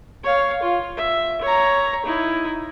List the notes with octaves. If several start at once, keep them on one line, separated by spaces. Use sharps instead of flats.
C#5 F5
F4
E5
C#5 A#5
D#4 E4